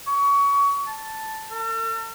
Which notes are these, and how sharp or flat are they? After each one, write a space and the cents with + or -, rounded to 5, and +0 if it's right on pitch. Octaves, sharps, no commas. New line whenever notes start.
C#6 +25
A5 +0
A4 +45